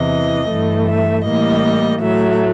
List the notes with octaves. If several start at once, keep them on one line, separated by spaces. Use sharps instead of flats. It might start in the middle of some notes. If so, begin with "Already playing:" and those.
Already playing: E2 C3 E3 D#5
G2 E3 A3
E5
A2 E3 G3 A#3 D#5
A2 F#3 A3 E5